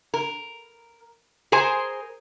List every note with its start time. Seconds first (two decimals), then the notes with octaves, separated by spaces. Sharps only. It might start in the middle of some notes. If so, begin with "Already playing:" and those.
0.14 A#4
1.52 G#4 A#4 C5 G#5